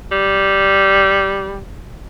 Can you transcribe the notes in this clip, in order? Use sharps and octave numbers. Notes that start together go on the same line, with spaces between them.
G3